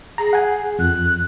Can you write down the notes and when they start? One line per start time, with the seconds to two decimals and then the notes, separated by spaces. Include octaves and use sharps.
0.18 G#4 A#5
0.33 F#5 G#5
0.79 F2 F#6